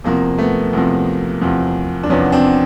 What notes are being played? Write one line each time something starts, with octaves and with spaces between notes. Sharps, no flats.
E2 C3 F3 A#3
A3 B3
E2 C3 F3
E2 C3 F3
D4
E2 C3 F3 B3 C#4
C4 D4